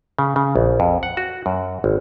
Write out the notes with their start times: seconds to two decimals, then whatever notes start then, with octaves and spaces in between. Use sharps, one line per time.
0.19 C#3
0.36 C#3
0.56 A#1
0.80 F2
1.03 F#5
1.17 F#4
1.46 F#2
1.84 G#1